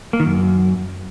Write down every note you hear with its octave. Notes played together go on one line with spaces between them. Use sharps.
A#3
D#3
F#2